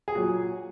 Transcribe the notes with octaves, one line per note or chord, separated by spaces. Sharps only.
G#4
A#2 F#3 F#4